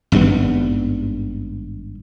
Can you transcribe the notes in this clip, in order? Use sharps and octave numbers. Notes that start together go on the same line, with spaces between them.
G#1 G2 G3 B3